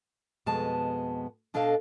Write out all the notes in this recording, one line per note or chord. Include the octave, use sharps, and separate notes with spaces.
F2 B2 G#3 B3 A5
B2 D4 A4 D#5 F5